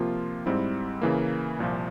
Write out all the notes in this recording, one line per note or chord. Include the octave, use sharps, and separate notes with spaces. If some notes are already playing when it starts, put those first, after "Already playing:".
Already playing: C3 F3 A#3 F4
G#2 G3 C4 E4
C#3 E3 A#3
C2 A#2 F3